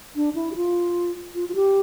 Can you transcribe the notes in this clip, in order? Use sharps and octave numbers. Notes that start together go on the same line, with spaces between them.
D4
E4
G4
F4
F4
F4
G4